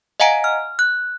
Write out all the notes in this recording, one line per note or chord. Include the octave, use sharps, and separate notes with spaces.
D#5 F5 F#5 G#5 A#5 D7
F6
F#6